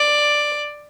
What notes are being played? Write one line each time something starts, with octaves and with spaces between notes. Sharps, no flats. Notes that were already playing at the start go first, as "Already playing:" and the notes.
Already playing: D5